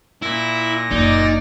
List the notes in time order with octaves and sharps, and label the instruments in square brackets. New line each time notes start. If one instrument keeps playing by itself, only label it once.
[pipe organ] A#2 A#6 [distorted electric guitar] E4
[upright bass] F#1 [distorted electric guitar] D#4 [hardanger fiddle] D5